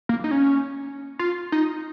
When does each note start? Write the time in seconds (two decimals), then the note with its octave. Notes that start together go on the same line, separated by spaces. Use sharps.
0.09 A#3
0.24 D#4
0.31 C#4
1.19 F4
1.52 D#4